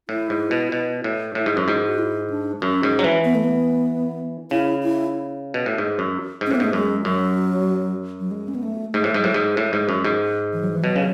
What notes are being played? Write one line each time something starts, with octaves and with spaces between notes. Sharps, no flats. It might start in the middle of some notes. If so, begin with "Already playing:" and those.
A2 E4
G#2
B2
B2
A2
A2 E4
G#2
F#2
G#2
F#4
E4
D4
F#2 C#4
G#2
F#3
E3
B3
A3
B3
C#3 E4
E4
B2
A2
G#2
F#2
G#2
C#4
A2
B3
G#2 A3
F#2 G#3
F#2 F#3
F#3
G#3
C#4
B3
A3
G#2 A3
A2 G#3
G#2
A2 F#3
G#2 G#3
A2
G#2
F#2
G#2
E3
F#3
E3
B2 F#3
C#3